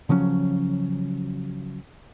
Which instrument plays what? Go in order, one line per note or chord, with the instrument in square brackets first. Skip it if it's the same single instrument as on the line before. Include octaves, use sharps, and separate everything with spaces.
[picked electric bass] C#3 F3 F#3 C#4